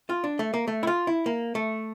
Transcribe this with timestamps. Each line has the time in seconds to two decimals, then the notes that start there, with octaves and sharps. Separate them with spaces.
0.09 F4
0.24 D4
0.39 A3
0.54 A#3
0.68 A3
0.83 E4
0.87 F4
1.07 E4
1.26 A#3
1.55 A3